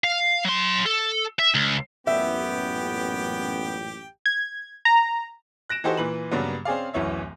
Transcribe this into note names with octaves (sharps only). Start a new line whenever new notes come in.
F5
F#3 C6
A4
E5
C#2
A1 F#2 A#2 B3 G4 E5 G5
G#6
A#5
F#6 A#6 D7 E7
E3 D#4 F#4 G4 A4 C5
A#2 E3 B4 F#7
G2 C#3 F#3 G3 A#3 B3
C4 C#4 G#4 D5 F5
D1 F#2 E3 C#5 E5